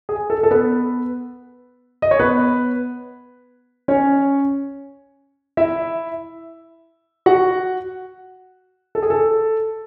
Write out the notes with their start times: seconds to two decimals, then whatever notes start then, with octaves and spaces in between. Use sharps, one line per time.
0.09 G#4
0.30 A4
0.43 A4
0.51 B3 B4
2.02 D#5
2.11 C#5
2.19 B3 B4
3.88 C#4 C#5
5.57 E4 E5
7.26 F#4 F#5
8.95 A4
9.02 G#4
9.10 A4